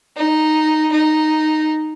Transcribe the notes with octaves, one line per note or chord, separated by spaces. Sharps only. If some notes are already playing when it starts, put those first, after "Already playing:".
D#4
D#4